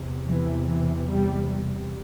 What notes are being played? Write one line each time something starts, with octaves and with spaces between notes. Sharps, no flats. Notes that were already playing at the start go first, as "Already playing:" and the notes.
Already playing: E2 C3
E3
E3
G3
G3